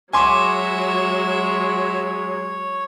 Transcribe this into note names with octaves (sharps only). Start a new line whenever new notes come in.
F#3 G#3 F#4 C#5 E5 G#5 C6 D6